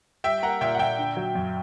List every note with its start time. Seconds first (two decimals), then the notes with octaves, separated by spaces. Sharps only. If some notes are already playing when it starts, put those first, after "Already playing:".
0.24 G3 E5 G5
0.43 A#3 F#5 A#5
0.61 A#2 E5 G5
0.75 F#5
0.79 A#2 E5 G5
0.99 D3
1.17 F#3
1.35 F#2